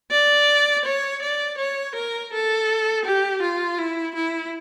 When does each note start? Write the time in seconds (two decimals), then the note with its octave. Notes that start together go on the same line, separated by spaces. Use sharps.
0.11 D5
0.85 C#5
1.22 D5
1.58 C#5
1.95 A#4
2.32 A4
3.05 G4
3.42 F4
3.78 E4
4.15 E4